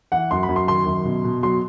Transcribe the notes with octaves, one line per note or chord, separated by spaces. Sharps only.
E3 F#5
F#2 C6
B5
F#2
C6
D#3 C6
F#2
B2
B2
F#3 C6